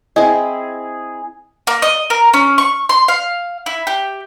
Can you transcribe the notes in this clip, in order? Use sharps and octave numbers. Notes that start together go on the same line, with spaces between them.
C4 E4 G#4 D#5
A#3
D#5
A#4
C#4
C#6
C6
F5
E4
G4